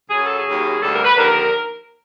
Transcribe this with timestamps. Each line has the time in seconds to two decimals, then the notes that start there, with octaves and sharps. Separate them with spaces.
0.10 F#2 C#3 F#3 G#4
0.24 A4
0.37 G#4
0.46 D#2 C#3 F#3
0.81 D2 C3 E3 G3 A4
0.93 A#4
1.04 B4
1.17 D#2 D3 F3 A#4